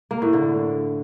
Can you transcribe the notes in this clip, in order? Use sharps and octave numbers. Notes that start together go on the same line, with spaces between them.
A#3
A2
D3